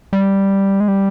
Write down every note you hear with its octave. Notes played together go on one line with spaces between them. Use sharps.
G3
G#3
G3